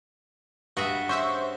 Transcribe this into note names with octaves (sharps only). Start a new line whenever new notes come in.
G2 F#4 G#4 E5
C#4 C5 E5 C#6